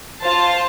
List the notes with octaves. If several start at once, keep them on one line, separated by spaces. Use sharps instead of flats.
F4 C5 F5 A5